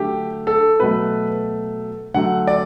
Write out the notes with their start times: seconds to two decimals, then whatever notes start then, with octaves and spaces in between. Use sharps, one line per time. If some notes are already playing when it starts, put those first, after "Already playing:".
Already playing: D3 F#3 A3 G4
0.47 A4
0.80 B2 F#3 A3 B4
2.14 D3 F#3 A3 F#5
2.47 D5